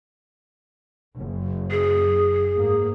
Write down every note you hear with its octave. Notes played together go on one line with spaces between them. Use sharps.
F#1
G#4
G#2 A#3